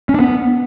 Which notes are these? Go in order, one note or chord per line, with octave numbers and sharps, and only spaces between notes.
C#4
D4
B3